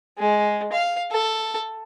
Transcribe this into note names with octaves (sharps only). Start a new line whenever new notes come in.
G#3
F5
A4